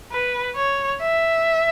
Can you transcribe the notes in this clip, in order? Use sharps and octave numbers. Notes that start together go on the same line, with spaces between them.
B4
C#5
E5